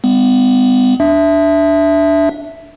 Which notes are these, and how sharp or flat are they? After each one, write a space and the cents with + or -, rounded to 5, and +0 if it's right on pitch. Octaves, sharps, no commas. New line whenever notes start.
G3 +35 B3 +40
D4 +0 E5 +0